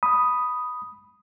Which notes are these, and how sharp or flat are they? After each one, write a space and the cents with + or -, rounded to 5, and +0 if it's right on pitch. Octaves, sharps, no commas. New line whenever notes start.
B5 +0 D#6 +0